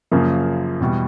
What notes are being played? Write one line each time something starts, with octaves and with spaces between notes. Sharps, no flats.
F#2 C#3 F3 A#3
E2 B2 G3